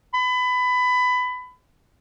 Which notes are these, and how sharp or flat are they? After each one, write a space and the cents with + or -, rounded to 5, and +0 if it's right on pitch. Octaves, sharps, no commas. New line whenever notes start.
B5 +20